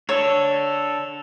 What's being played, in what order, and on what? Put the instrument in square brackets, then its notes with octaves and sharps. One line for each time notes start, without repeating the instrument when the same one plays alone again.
[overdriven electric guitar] D4 A4 [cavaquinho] C#5 [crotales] E6 E7 F7